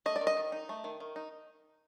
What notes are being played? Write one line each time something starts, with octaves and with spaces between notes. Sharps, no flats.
A3 D#5
D5
D#3
D#5
D#3
D#4
A3
D#3
D#3
D#4